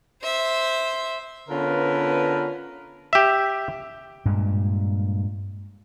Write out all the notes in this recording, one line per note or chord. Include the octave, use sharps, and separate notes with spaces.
C5 E5
D3 B3 C#4 F4 A#4 B4
G4 E5
G2 A#2 G#3